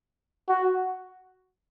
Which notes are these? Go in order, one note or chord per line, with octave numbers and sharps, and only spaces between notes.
F#4